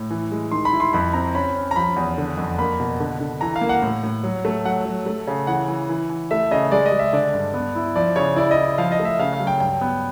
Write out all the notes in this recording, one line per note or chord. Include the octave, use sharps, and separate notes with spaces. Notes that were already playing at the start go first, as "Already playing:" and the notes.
Already playing: A2
E3
G#3
D#3 C6
B5
E4
C6
F2 B5
C4 A#5
C#4 B5
C#4
A#5
F3 B5
E2
D3
F2
A#3 B5
B2
D3
D3
E3 A#5
F5
A#3
F#5
A2
A2
F#3
A3
F#3 F#5
F#3
A3
C#3
E3 F#5
E3
E3
E3
A3 E5
C#3 D#5
G#3 D5
D#5
G#3
E5
D3 D5
G2
B3
E4
F3 D5
C#3 C#5
E4 D5
D#5
E4
F3 F5
D#5
A3
E5
C#3 F5
F5
F#3
G5
G2 G5
B3